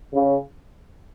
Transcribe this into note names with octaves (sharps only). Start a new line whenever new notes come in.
C#3